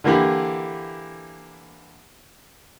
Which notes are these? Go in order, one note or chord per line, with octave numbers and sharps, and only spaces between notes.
D3 E3 A#3 G4 B5